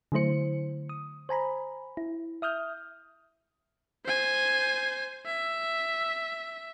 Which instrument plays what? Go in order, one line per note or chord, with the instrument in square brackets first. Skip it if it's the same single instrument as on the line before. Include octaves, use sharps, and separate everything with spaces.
[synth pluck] D3 F#3 A3 E4 C5 C#7
D#6
C5 G#5 A#5 B5
E4
E5 D#6 F6 G6
[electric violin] C5 G#5
E5